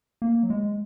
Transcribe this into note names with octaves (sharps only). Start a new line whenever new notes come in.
A#3
F#3
G#3